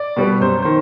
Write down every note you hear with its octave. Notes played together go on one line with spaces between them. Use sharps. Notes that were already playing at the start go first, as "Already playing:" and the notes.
Already playing: D5
B2 G3 B3
F#2 C5
D#3 C5